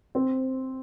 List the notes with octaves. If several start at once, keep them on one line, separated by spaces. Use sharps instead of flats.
C4